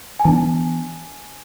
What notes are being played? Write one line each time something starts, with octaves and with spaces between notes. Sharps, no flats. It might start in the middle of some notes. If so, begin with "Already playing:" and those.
G#5
E3 B3 D4 A5